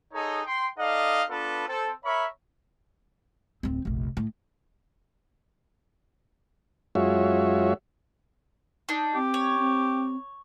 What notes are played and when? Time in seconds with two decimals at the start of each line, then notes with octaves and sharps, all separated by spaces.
0.13 D#4 G#4 A4 C#5 D#5
0.45 G5 C6
0.78 D#4 A4 D5 D#5 F5
1.30 B3 D4 F4 A4 B4
1.67 C4 A4
2.05 A#4 C#5 E5 B5 C#6
3.63 D1 C4
3.85 F1 A#1
4.17 A2
6.95 F#2 G#3 F4 F#4 C#5 E5
8.89 D4 D#4
9.15 C4 G4
9.34 C#5
9.58 C4